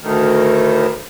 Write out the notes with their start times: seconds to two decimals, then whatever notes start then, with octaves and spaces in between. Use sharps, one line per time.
0.01 D2 A2 D#3